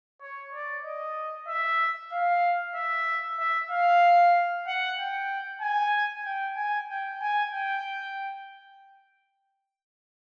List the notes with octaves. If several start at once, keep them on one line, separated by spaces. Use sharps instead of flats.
C#5
D5
D#5
E5
F5
E5
E5
F5
F#5
G5
G#5
G5
G#5
G5
G#5
G5